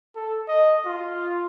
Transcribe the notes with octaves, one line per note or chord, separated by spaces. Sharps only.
A4
D#5
F4